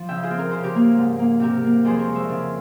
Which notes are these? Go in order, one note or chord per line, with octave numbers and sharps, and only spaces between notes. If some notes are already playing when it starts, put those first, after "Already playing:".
Already playing: F3
C#3 E5 G5
F4 G#4
C4
A#4
C#3 C5
G4 A#4
A#3
G#2
A#3
C3 G4 A#4
A#3
F2 G#4 C5
A#4 C#5
G#3
C5 E5
C#3